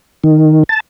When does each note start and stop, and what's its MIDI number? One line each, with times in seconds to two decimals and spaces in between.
0.24 0.64 51
0.69 0.80 81